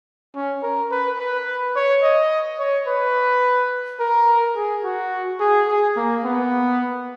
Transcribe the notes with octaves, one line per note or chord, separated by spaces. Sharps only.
C#4
A#4
B4
B4
C#5
D#5
C#5
B4
A#4
G#4
F#4
G#4
G#4
A#3
B3